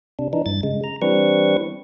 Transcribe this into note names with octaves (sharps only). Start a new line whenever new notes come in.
C3 D4
E3 D4 D#4
G2 A6
C#3 G#3
A#5
E3 G3 C4 D4 B4 C#6